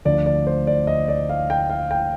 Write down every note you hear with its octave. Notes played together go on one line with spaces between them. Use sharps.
D2 D3 F3 D5
D5
C5
D5
D#5
D5
F5
G5
F5
G5